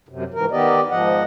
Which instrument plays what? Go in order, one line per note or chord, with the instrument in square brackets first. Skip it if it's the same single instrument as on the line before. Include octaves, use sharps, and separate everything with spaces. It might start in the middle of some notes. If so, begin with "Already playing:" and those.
[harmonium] F#2 C3
G#2 E3 A#4
D#3 B3 G4 D5 D#5
G#2 F3 D#5 F#5